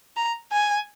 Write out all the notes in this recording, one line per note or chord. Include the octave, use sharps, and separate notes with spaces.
A#5
G#5